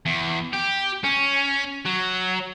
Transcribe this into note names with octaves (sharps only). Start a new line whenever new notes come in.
E2
G4
C#4
F#3